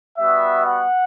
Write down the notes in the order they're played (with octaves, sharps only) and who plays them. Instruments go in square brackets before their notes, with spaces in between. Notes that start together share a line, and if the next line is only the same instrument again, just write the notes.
[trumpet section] G3 B3 F#4 E5
F#5